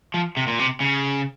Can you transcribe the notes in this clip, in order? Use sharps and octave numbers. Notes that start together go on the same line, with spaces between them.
F3
C3
A#2
C3
C#3